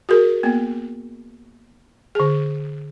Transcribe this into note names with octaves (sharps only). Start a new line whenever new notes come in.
F#4 G#4 A#4
A#3 B3
D3 G#4